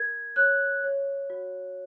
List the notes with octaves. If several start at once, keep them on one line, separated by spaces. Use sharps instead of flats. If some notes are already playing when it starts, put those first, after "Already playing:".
Already playing: A#4 G#6
C#5 F#6
C#5
F#4